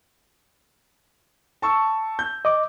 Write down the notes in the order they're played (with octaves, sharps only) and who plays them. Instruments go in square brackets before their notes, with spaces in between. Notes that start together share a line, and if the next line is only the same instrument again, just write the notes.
[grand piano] A5 C#6 E6
G6
[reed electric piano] D#5 D6